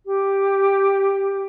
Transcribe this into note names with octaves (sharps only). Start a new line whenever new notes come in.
G4